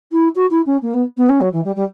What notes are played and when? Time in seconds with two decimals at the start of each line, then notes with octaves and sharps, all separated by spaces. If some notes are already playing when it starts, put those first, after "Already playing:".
0.12 E4
0.35 F#4
0.50 E4
0.66 C#4
0.82 A#3
0.93 B3
1.17 B3
1.29 C#4
1.40 F#3
1.52 E3
1.64 G3
1.75 G3